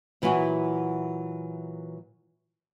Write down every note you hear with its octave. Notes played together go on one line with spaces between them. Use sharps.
A#2 E3 F#3 E4 F#4